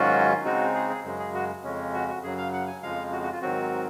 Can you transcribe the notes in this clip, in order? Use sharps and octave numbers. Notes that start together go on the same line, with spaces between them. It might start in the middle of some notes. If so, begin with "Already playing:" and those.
Already playing: G#2 D#3 F#3 C#4 F4 F#4
C#3 G#3 C4 D#4 F#4
G#4
G#4
F#2 C#3 G#3
G#4
F#4
F2 C#3 G#3 C#4
F#4
F#4
F#2 C#3 F#3 G#4
F5
F#5
G#5
F2 C#3 F3 G#3 F5
F#4
F#4
F4
G#2 D#3 F#3 C4 F#4